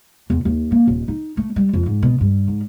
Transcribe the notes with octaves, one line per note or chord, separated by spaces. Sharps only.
E2
D#2
A#3
D#1
D#4
A3
G3
F2
G#2
B2
G2
G#2